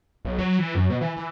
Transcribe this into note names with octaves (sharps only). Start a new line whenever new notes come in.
B1
F#3
E3
F#2
B2
E3
E3